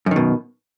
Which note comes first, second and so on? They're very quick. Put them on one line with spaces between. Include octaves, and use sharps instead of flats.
F#2 D#3 B2